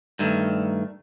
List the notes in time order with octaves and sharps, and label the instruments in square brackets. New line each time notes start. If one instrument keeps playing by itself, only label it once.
[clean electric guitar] G2 D#3 A3